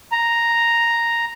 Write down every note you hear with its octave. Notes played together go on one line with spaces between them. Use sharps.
A#5